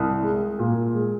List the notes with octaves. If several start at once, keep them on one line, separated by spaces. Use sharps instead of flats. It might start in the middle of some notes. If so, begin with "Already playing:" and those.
Already playing: C2
G#3
A#2
G#3